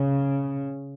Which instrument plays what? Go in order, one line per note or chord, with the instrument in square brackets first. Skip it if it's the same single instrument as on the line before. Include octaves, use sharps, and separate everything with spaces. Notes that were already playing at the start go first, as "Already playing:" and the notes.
Already playing: [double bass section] C#3